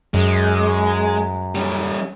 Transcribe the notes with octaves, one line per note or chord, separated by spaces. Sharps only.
F#2 G#3
G3 C#4